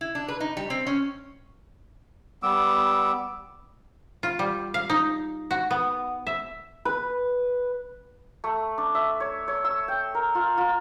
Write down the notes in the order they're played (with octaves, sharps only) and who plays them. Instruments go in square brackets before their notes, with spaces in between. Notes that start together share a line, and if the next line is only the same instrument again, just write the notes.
[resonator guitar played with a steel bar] E4
D4
B4
D#4
G3
C4
C#4
[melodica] G3 B3 D6 E6
[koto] F4
G3
F5
D#4
F#4
B3
E5
[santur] B4
A3
D4
E5
C#5
C#5
E6
G5
A#4
F4
F4